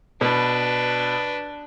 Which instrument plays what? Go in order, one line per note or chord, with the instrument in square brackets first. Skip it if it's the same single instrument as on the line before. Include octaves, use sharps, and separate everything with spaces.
[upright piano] B2 [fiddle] D4 B4